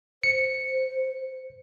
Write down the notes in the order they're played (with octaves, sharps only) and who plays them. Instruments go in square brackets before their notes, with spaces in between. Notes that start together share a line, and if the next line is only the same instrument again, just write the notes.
[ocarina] C5 [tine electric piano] C#7